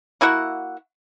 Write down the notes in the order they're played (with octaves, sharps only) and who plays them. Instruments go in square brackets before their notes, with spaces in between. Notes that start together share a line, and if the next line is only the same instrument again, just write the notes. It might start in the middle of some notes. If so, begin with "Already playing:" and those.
[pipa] A#3 E4 F#4 F#5